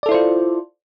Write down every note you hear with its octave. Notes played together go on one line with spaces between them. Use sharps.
E4 F4 A4 C5 D5